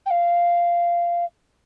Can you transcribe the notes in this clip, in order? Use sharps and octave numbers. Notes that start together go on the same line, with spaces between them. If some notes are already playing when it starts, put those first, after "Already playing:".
G5
F5